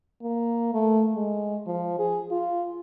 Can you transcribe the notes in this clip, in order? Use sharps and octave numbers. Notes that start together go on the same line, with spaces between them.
A#3
A3
G#3
F3
G#4
F4